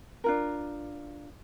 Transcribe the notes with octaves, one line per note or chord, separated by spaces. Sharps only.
D4 F4 A#4